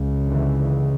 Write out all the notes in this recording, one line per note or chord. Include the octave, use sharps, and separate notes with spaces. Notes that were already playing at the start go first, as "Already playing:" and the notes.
Already playing: C#2 C#3
D3 E3